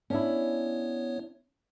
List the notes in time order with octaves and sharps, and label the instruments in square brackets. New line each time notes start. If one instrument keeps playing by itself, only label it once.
[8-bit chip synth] B3 C#5 [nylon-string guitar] C#4 D4 E4